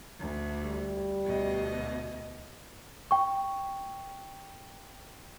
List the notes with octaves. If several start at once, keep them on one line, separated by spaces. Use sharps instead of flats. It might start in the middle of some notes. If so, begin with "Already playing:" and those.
D2
G3
D2 B2 D#5
G5 C#6